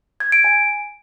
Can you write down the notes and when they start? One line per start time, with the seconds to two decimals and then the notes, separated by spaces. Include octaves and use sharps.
0.20 G#6
0.32 D7
0.44 G#5